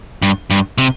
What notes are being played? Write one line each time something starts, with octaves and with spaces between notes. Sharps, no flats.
G2
G2
C3